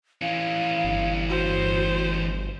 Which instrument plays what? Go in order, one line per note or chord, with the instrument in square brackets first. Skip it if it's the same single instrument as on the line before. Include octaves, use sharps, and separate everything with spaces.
[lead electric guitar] E3 C#4 [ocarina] F5
[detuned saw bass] G1
[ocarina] F#4 [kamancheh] C5